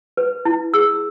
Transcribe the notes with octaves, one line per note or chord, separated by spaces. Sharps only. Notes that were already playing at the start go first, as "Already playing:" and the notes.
B4
E4
G#4 E6